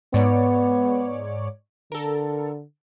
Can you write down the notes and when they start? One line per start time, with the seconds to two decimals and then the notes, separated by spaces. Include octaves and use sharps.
0.14 G#2 B3 C#5 D5
1.92 D3 A4 A#4